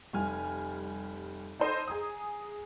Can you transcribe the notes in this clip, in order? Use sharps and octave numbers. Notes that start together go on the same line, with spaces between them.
F1 G3 G#5 F6
D#4 A4 C5 D#5
G#4 G#5 A#5 D#6